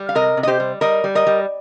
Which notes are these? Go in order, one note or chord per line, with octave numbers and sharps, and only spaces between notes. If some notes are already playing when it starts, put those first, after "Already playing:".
Already playing: G3
F5
C3 A#4 D#5
C3
D#5
G4 C5
G3
G3 A#4 D#5
G3
A#4 D#5
G3